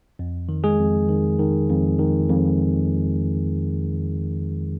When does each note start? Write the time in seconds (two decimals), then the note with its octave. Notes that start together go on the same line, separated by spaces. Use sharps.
0.19 F2
0.49 D#3
0.64 G#3 G#4
0.79 F2
1.09 D#3
1.39 D#3
1.70 F2
1.99 D#3
2.30 F2